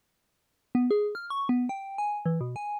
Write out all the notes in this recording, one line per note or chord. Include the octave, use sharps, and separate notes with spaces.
B3
G#4
F6
C#6
B3
G5
G#5
E3
B2
G#5